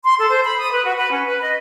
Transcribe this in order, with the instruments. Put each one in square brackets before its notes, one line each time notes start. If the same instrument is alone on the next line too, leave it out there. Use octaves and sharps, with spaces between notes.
[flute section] C6
A4
C5
B5
D#6
B4
F#4
B4
C#4
B4
D#5